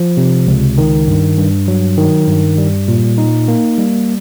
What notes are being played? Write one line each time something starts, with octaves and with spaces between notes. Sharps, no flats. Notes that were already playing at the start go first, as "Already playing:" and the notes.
Already playing: F3
C3
C#2
D#3
G2
G2
F#3
D#3
G2
G3
A#2
D#4
A#3
G3